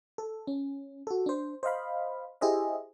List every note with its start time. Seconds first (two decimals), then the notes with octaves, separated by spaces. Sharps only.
0.18 A4
0.47 C#4
1.07 F#4 A4
1.26 D4 C5
1.63 C5 D#5 F5 B5
2.41 E4 G4 G#4 C5 D#5 E5